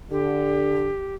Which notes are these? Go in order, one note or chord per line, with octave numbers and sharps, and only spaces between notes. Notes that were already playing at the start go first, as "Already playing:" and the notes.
D3 G4